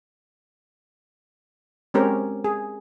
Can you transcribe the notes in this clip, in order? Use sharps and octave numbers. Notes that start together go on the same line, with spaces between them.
G#3 C4 C#4 G4 A#4
G#4